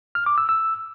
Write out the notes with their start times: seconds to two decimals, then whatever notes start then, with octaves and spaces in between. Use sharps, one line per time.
0.15 F6
0.26 D6
0.38 E6
0.49 E6